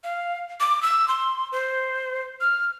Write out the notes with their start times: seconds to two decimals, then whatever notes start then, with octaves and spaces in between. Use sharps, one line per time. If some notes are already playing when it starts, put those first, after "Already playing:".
0.04 F5
0.60 D6
0.83 E6
1.08 C6
1.52 C5
2.41 F6